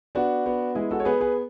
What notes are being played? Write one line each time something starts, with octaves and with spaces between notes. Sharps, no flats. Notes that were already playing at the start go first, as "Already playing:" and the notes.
B3 D4 F#4
B3
G#3 E4 G#4
F#4 A4
C#5
B3 G#4 B4
G#4 B4